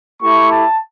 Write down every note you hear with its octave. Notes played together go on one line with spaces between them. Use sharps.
A3 E4 G4 C#6
A5